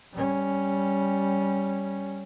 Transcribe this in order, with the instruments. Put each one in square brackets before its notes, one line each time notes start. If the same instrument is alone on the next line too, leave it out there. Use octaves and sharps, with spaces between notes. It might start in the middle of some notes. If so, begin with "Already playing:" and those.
[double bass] G3 C#4